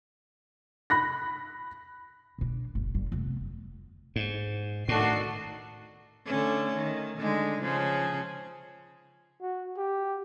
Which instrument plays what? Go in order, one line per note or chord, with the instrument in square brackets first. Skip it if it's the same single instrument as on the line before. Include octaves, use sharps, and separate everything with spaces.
[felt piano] B5 F#6 A#6
[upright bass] B2 D4
G1
G1 G3
F1 B3
[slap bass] G#2
[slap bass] A2 [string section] D#3 A4 C7 [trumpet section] D4 F#4
[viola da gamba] D3 A3 C#4
D#3
D3 G#3 D#4
C#3 F3 G#4
[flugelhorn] F#4
G4